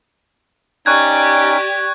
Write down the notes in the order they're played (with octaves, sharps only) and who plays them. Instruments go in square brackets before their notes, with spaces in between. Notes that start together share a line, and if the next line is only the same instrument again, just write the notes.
[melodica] C#4 D#4 [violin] G4 D5 [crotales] C#6 F#6 G#6